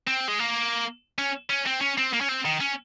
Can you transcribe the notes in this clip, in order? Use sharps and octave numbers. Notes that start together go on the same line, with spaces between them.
C4
G#3
A#3
C#4
C#4
C4
C#4
C4
A#3
C#4
C4
D#3
C#4